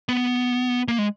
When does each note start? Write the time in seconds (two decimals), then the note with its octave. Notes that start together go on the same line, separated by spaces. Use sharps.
0.09 B3
0.88 A#3
0.98 G#3